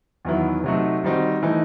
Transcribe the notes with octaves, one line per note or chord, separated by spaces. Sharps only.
E2 D#3 F#3 B3 E4
C3 F#3 A3 D#4 F#4
D#3 G3 C4 D#4 F#4
E3 A3 D#4